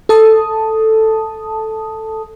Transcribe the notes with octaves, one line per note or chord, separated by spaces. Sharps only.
A4 A5 D#6